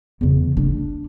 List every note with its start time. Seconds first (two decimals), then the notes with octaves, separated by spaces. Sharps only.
0.21 E2 C#3
0.57 D4